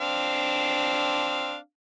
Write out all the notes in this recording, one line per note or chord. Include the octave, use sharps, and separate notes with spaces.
C4 D4 F5